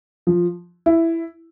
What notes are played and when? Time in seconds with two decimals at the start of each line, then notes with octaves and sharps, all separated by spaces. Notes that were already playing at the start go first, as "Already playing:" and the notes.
0.27 F3
0.86 E4